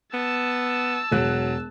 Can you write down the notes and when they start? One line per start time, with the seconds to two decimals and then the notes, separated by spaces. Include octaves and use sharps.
0.14 B3 A5 E6
1.12 E1 F#3 F#6